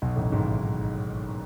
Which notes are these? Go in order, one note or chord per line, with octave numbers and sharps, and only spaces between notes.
B1 B2
A1 A2
G#1 G#2